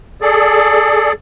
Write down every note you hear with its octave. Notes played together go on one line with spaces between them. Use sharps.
G#4 A4 D5